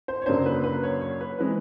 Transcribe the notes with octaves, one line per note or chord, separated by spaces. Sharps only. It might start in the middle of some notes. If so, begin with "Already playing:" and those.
C5
C#5
F#2 C#3 F#3 A#3 D4 C5
B4
B4
C#5
C#5
B4
E3 G#3 C4 B4